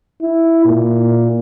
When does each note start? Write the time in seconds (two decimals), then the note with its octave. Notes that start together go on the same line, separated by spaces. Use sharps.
0.21 E4
0.65 A#2